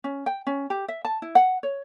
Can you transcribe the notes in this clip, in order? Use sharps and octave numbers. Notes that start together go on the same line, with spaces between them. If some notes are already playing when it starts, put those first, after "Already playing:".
C#4
G5
C#4
G4
E5
A5
E4
F#5
C#5